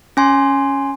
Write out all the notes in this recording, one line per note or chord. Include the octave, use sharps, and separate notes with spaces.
C#4 G#5 C6